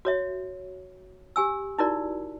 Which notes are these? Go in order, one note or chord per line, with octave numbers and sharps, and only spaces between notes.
F#4 C#5 E5
G4 G#5 E6
D#4 E4 F#4 A#4 D5